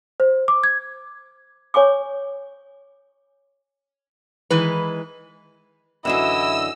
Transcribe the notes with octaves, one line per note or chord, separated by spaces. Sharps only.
C5
D6
G#6
C#5 G#5 C#6 D6
D#3 E3 G#3 B4
F#2 D3 E3 E4 D#5 E6